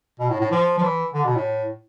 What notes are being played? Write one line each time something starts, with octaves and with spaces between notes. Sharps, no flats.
B2
A2
A2
F3
F3
E3
D3
B2
A2